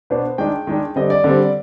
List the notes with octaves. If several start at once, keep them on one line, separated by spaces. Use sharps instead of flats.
B2 B3 D4 C5
D#3 G#3 D4 G5
D#3 G#3 D4
D3 G3 C4 D#5
D5
D3 G3 C4